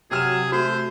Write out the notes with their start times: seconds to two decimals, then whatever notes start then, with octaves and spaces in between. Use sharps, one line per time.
0.11 C3 F#3 G#4 F6 E7
0.52 A3 F#4 C5